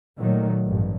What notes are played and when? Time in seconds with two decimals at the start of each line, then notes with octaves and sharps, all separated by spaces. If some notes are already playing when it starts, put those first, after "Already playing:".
0.18 A#2 D#3 F#3 A3
0.65 A1 G2